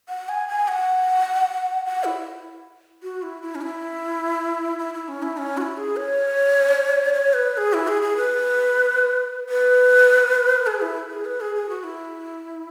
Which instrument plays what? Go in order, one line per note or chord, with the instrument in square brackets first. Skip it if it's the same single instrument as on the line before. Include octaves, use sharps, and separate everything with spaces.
[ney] F#5
G#5
G#5
F#5
F#5
E4
F#4
E4
E4
C#4
E4
E4
E4
C#4
E4
C#4
F#4
E4
G#4
C#5
C#5
B4
B4
G#4
E4
G#4
G#4
B4
B4
G#4
E4
G#4
B4
G#4
G#4
F#4
E4